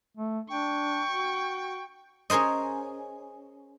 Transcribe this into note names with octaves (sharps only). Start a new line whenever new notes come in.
A3
D4 G5 C#6
F#4
C#4 G#4 A#4 C5 D#5